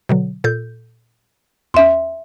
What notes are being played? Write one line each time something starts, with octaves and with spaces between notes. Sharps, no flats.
B2 D3 F#3
A#2 A4 G6
E2 C#4 E5 C6